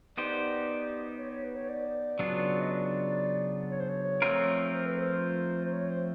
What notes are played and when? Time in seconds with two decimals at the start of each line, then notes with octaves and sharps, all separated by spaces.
0.17 B3 D#4 G4 C5 D5
1.18 C#5
1.31 C#5
1.44 B4
1.56 C#5
1.69 D5
2.19 C#3 F#3 B3 D4 F4
2.61 D#5
2.70 D5
3.71 C#5
3.80 C5
3.89 C#5
4.22 F3 A3 C4 F4 A#4
4.72 C5
4.86 B4
4.99 C5
5.65 C5
5.73 C#5
5.89 C5